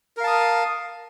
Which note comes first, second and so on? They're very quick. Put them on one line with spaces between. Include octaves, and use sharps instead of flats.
A#4 F5 A5 D#6